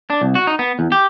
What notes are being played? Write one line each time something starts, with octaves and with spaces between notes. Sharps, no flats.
D4
C2
F#4
D#4
B3
E2
G4